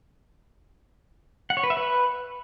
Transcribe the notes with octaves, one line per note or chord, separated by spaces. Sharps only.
F#5
C#5
B4
E5
B4